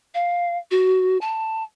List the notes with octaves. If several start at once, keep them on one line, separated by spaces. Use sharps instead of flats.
F5
F#4
A5